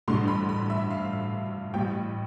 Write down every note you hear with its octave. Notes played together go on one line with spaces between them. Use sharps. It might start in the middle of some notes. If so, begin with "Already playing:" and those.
A1 G2 D3 C6
B5
B5
E5
F5
A1 A2 G3 G5